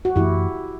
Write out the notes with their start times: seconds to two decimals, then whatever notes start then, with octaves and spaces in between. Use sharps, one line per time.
0.05 F#4
0.16 F#2 E3 A3 E4 G4